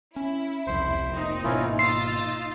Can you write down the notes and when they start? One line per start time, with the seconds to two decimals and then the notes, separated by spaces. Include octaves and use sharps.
0.16 C#4 E4
0.67 E1 C2 F2 E4 C5
1.10 F1 A#2 C4 D#4
1.44 G#1 B2 A#3 C#4 E4 F4
1.79 D#4 F4 C6 E6 A6 C7